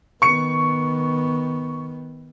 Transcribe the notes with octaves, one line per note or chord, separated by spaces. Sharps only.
D#3 B3 C#6 C#7